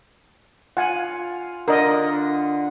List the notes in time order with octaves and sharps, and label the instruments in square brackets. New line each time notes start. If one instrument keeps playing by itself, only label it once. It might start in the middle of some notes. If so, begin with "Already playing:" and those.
[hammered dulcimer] F4 [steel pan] F#5 G#5
[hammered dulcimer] D3 [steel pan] A#4 D#5